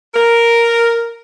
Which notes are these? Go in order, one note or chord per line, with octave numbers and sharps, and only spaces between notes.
A#4